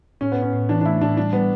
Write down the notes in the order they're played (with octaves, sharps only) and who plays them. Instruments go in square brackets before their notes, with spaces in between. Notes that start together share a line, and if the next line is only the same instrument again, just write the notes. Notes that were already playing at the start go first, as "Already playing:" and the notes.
[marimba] A2 [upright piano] C#4
[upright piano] B3
[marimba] A2
[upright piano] C#4
[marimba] A2
[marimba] E3 [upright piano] D4
[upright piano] D4
[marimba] A3 [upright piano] E4
[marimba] A2 [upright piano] D4
[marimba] G3 [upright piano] D4
[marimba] G3 [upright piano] B3